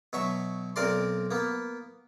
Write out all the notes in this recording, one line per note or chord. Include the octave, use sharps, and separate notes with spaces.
B2 F#3 E5 C#6
B1 C4 A#4 D5 C6
A#3 B3